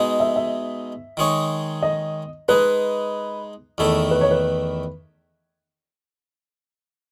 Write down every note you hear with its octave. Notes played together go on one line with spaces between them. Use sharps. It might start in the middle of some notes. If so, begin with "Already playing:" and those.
Already playing: B2 G#3 D#4 G#4
E5
E5
D#3 G#3 D#4 G#4 C#5
D#5
G#3 D#4 G#4 B4
E2 D#3 A3 E4 A4
B4
C#5
B4